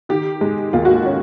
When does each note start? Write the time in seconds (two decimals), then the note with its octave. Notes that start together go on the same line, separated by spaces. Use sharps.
0.09 D#3 G4
0.41 G#3
0.73 D#2 F4
0.85 F#4
0.94 F4
1.05 C#4